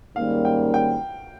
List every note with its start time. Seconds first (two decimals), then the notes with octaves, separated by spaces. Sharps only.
0.16 G#2 D#3 G3 A#3 C#4 F5
0.45 G5
0.74 G5